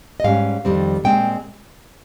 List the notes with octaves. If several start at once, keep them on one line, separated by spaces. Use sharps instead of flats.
D#5
G#2 G3 C#4 F5
F2 D#3 G3 C4
A#2 G#3 C4 G5